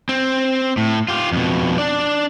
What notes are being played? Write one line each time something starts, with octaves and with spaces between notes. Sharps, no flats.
C4
A2
F4 G4
F2 B2
D4 D5